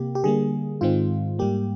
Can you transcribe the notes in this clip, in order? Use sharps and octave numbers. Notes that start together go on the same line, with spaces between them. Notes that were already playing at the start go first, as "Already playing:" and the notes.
Already playing: C3 A#3 G4
G4
D3 G3 A#3 G#4
G#2 D#3 G#3 C4 F4
G#2 G3 A#3 G4